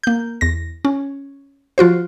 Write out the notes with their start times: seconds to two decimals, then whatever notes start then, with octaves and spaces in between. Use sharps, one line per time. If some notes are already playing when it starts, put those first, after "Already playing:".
0.04 A#3 G6
0.41 E2 A#6
0.85 C#4
1.78 F3 F4 F#4 C5